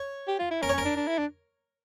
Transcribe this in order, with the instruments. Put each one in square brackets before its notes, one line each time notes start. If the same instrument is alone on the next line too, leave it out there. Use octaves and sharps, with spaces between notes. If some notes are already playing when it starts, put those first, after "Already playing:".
Already playing: [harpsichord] C#5
[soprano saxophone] G4
F4
E4
[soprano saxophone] C#4 [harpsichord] A#4
[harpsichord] C#5
[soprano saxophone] C#4
[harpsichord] A#4
[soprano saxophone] D4
D4
E4
D4